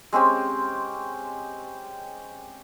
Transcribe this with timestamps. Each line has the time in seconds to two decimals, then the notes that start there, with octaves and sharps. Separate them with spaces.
0.13 G#3 C4 C#4 G4